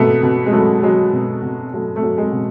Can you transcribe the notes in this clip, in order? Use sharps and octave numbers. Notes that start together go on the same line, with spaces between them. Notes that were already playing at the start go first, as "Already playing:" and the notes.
Already playing: B2 A3 B3
B2
G#3
F#3 A3
F#3 G#3
B2
B2
F#3 A3
A3
F#3
G#3
B2